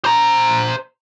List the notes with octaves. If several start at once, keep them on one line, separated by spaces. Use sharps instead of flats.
C5 A#5